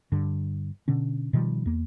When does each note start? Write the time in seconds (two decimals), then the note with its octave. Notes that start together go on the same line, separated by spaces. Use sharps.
0.12 G2 D3
0.88 B2 D3 C#4
1.33 B2 D#3 F3 G3
1.66 E2 A#3